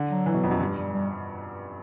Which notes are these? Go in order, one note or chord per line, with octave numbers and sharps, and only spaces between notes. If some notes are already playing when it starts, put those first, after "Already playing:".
Already playing: D3
F#3
E3
B2
F2
F#2
G2
G3
G3